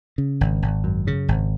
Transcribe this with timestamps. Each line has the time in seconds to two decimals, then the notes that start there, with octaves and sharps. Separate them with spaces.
0.18 C#3
0.41 G#1
0.62 G#1
0.84 F#2
1.07 C#3
1.28 G#1